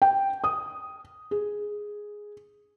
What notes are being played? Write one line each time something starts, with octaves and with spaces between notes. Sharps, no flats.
G5
D#6
G#4